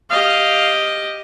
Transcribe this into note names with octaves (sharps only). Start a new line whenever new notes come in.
G4 D#5 F5